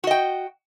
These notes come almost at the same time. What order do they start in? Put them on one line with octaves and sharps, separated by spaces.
F#4 D#5 G5